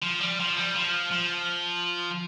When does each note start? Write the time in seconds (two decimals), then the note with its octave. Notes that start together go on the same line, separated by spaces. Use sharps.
0.03 F3
0.21 G3
0.39 F3
0.56 G3
0.75 F3
1.11 F3